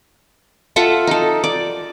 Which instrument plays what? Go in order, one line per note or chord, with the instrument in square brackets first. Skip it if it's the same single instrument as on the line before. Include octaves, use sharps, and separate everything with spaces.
[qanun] F4 A4 E5 F#5
D#4 A4
D5